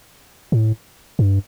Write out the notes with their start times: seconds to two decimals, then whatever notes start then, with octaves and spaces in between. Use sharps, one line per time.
0.52 A2
1.19 G2